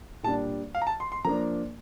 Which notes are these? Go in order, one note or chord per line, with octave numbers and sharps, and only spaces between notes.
A#2 G3 D4 A5
F5
A#5
A5
C6
C6
F3 A#3 D4 A#5